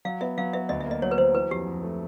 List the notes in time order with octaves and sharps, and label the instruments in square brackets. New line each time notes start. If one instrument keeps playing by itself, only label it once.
[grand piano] F#3 [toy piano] F5
[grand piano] B3 [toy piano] E5
[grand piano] F#3 [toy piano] F5
[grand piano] B3 [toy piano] E5
[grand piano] D2 [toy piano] D#5
[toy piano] E5
[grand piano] A#3 [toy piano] D#5
[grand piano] F#3 [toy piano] C#5
[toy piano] B4
[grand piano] F#3 [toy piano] C5
[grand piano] E3 [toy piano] B4
[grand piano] F2 [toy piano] G4
[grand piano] F2
A3